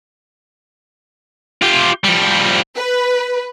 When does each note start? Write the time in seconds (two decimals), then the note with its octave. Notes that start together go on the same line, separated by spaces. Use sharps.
1.62 F4 G4
2.04 F3 G3
2.76 B4